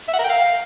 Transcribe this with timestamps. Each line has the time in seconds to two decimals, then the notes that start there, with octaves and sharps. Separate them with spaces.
0.08 E5
0.13 F#5
0.19 A#4
0.24 G5
0.30 F5